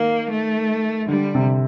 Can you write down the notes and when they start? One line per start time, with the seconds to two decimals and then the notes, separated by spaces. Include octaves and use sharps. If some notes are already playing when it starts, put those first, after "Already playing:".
Already playing: D#3 A#3
0.30 A3
1.08 D3 G3
1.35 C3